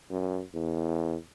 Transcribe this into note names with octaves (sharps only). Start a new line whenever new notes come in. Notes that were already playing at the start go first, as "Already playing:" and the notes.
F#2
E2